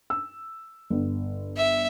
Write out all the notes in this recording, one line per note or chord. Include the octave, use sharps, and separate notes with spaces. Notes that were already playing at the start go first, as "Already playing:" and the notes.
E6
G1
E5